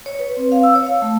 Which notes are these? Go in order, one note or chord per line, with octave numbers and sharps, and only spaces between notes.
C#5
B4
C4
F5
E6
C#5
F5
A3